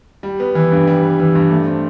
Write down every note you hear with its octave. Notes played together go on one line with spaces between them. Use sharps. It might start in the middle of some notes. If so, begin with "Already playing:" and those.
G3
B3
E3
G2
G3
B3
E3
G2
A3
C4